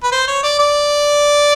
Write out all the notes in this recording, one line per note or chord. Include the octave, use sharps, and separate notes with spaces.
B4
C5
C#5
D5
D5